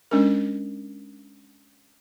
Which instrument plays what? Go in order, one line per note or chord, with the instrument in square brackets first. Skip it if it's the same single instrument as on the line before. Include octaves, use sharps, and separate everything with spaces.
[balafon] G#3 C#4 D4 A#4